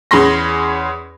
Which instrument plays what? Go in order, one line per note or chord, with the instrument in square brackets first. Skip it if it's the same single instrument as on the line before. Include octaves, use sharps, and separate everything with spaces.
[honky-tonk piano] E2 C#4 G#4 B5 C6 A#6